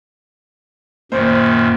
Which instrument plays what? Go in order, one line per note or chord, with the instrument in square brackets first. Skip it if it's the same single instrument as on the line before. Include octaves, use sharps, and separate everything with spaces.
[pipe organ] F#2 A#2 D#3 [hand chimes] A#3 [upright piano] C5